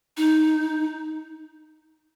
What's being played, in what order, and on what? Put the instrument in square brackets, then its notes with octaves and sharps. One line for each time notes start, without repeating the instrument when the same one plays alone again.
[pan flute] D#4